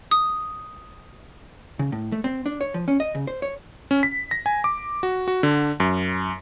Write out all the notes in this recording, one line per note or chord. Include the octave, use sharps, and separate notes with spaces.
D#6
C#3
A2
A3
C4
D4
C#5
F3
C#4
D#5
C#3
C5
C#5
C#4
B6
A#6
G#5
D6
F#4
F#4
D3
F#2